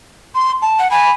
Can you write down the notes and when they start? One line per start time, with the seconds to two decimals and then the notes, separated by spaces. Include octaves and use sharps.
0.35 C6
0.62 A5
0.79 F#5
0.91 G#5 B5